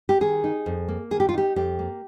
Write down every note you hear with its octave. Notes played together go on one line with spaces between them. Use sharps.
G4
D#3 G#4
D#4
F2
A#3
D#3 G#4
G4
F4
D#4 G4
F2 G4
A#3